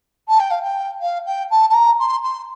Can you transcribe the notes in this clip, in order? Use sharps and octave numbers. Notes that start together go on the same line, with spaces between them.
A5
G5
F5
G5
F5
G5
A5
A5
A#5
C6
C6